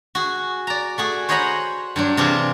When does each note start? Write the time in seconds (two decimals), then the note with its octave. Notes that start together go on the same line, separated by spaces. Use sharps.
0.15 F#4 G#4
0.67 D5 A#5
0.98 A3 F#4 G#4
1.29 C5 C#5 D#5 F#5 A#5 B5
1.96 G2 F#3 D4
2.17 C3 E3 C4 D4 F4 G#4